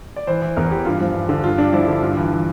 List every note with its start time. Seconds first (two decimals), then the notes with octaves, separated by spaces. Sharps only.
0.16 D5
0.27 E3 C5
0.42 E3
0.56 E2 A#4
0.71 E3 G4
0.85 G2 F4
1.01 F3
1.14 G2
1.29 D3
1.44 G2 F4
1.58 G2 D4
1.73 F3 E4
1.88 D3
2.03 G2 F4
2.17 E3
2.32 E3